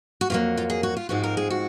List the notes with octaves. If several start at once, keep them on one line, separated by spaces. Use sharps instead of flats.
F#4
F2 D#3 F#3 A#3 F4
F4
G#4
F#4
F4
G#2 F3 G#3 C4 F#4
A#4
G#4
F#4